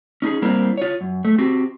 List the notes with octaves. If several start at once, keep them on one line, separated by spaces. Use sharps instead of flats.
C#4 D#4 G4 G#4
G3 A#3 C4 E4 A#4
F4 C#5
F#2
A3
C4 F#4 G4